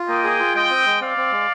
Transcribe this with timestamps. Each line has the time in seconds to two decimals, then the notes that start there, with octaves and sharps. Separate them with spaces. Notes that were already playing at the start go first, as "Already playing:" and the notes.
Already playing: F4
0.08 A#3 D#5 G5
0.24 G#4
0.39 F4
0.55 G#3 D#5 G5
0.70 C4
0.86 G#3
1.01 C4 D5 F5
1.17 C4
1.32 G#3